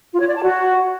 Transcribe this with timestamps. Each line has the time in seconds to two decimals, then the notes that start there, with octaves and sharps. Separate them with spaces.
0.12 F4
0.20 C#5
0.28 D5
0.35 A5
0.43 F#4